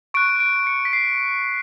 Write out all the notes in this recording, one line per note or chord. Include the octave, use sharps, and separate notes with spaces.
C#6 F#6 D7
D7
C#7
B6
C7